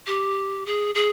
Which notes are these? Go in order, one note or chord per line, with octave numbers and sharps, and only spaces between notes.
G4
G#4
G#4